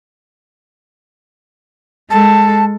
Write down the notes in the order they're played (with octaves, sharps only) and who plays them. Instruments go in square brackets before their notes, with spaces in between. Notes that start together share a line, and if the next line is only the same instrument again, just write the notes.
[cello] G#3 A4 [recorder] A5